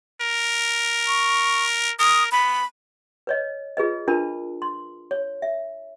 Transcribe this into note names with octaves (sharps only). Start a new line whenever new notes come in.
A#4
C#6
A#4 D#6
B3 B5
B4 C#5 D#5
F4 G#4 B4 D#5
D4 F4 A#4 B4 A5 B5
C6
C#5
E5